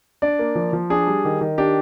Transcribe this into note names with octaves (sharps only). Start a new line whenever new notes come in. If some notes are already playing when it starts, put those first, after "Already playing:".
D4 D5
A#3
F3
F3
D4 G#4
G3
D#3
D#3
D4 G4